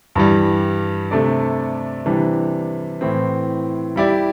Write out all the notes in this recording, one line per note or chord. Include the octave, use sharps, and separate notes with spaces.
G2 E3 G3
C3 A3 D4 A4 D5
C3 E3 G3 D4
A2 E3 C4
G3 E4 G4 D5